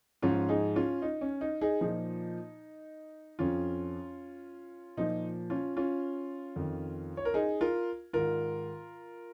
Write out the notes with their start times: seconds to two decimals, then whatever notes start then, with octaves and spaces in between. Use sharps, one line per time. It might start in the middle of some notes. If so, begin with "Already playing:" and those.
0.22 G#2 F3 C#4 F4
0.49 D#4 G#4
0.76 C#4 F4
1.02 D#4
1.21 C#4
1.41 D#4
1.61 D#4 G#4
1.81 A#2 F3 D#4
3.39 F2 F3 C#4 F4
4.97 A#2 F3 D#4
5.50 C#4 F4
5.77 C#4 F4
6.56 F2 D#3
7.17 C#5
7.25 A#4
7.34 D#4 G#4
7.61 F4 A#4
8.13 G#2 D#3 F4 A#4